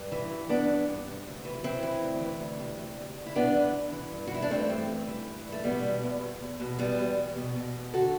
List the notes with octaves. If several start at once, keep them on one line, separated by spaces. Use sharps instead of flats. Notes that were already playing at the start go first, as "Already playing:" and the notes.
Already playing: G2
E3
G2
E3 B3 D4
G2
G2
C3
D2
E3
E3 C4 E4
E3
D2
E3
D2
C3
D2
D2
D2
E4
G2 B3 D4
E3
E3
E3
G2
F#4
E3 E4
D4
G2 A3 C4
G2
G2
E3
E3
G2
A3
B2 G3 B3
B2
E2
E2
E2
B2
E2 G3 B3
E2
E2
B2
B2
E2
D3 F#4 A4